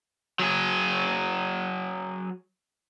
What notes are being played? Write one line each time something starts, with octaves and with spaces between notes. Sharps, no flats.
F#3 G#4